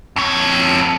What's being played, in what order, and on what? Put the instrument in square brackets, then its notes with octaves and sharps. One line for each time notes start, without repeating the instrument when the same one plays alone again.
[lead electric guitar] F2 C#5